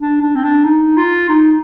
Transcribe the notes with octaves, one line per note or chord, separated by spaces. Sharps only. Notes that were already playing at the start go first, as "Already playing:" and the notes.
D4
D4
C4
D4
D#4
F4
D#4